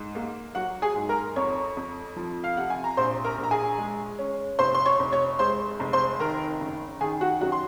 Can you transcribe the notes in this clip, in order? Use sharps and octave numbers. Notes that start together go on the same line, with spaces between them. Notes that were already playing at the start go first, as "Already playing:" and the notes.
Already playing: G#2
A#3
F#3 F#4 F#5
G#4 G#5
G#2
A#4 A#5
F2 C#5 C#6
F2
F3
F5
C3 F#5
G#5
A#5
A#1 C5 C6
A#4 A#5
A#1
A#5
G#4 G#5
G#3
C#4
F1 C5 C6
C6
C#5 C#6
F1
C#5 C#6
G#3 C5 C6
F1
C5 C6
D#3 A#4 A#5
F#1
D#3 G#4 G#5
F#4 F#5
F#2 F#4 F#5
C6